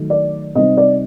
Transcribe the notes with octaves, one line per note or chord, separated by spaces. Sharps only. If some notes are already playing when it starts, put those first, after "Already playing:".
Already playing: D#3 F#3 A3 D#4
D5
C3 G3 C4 D#4 D#5
D5